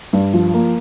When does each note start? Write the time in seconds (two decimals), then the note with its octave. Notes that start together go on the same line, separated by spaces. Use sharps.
0.13 G2
0.34 F3
0.54 A#3